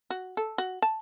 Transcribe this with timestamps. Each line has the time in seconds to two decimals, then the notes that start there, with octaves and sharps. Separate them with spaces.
0.10 F#4
0.37 A4
0.58 F#4
0.82 A5